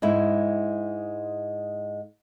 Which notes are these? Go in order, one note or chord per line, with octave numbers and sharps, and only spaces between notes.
G#2 G#3 E4